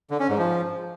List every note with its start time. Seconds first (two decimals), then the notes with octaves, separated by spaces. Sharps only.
0.10 D3
0.20 C#4
0.29 G#2
0.38 F3